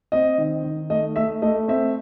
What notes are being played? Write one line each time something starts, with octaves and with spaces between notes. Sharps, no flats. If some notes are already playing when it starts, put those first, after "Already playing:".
C4 D#5
D#3
D#3
A3 D#5
A3 E5
A3 D#5
C4 E5